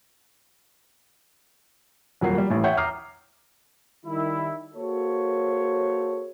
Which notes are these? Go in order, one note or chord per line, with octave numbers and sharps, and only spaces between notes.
D#1 F2 F#3 A#3 F#5 C7
G3
A1 A2
C#5 E5 F#5 G5 C#6 G6
A#5 D6 D#6 F6 C7
D#3 G3 E4
A#3 F#4 G#4 A4 C5 C#5